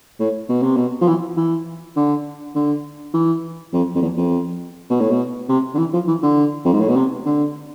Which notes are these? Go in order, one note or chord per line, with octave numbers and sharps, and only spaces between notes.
A2
B2
C3
B2
F3
E3
E3
D3
D3
E3
F2
F2
E2
F2
B2
A2
B2
C3
D3
E3
F3
E3
D3
F2
G#2
A2
B2
C3
D3